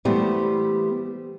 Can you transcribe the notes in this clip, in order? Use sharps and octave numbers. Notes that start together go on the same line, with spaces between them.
E3 G3 A3 B3 G4 C5